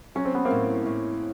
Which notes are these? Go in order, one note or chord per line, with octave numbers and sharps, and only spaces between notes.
F#3 C#4
C4
B3
A#3 C4
A2
A2